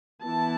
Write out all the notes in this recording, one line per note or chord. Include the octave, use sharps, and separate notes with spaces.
E3 B3 E4 A5